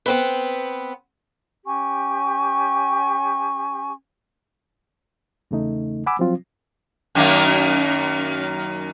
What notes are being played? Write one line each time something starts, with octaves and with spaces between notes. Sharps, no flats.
B3 C4 B4
C#4 G4 G#5 C#6
E2 C#3 A3 D#4
F#5 G#5 B5 D6 E6
F3 F#3 C4 F4
F#2 D#3 A#3